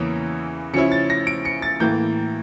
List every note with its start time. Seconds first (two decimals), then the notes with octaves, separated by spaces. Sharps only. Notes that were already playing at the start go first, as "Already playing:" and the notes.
Already playing: E2 C#3 E3 A#3 C#4
0.73 C#3 F3 C#4 E4 C#7
0.92 A6
1.10 A#6
1.27 D7
1.45 C#7
1.62 A6
1.80 A2 E3 A#3 G6